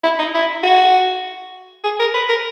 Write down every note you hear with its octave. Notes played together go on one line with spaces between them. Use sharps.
E4
D#4
E4
F#4
G#4
A#4
B4
A#4